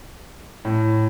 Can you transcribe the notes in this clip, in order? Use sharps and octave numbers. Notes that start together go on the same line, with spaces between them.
A2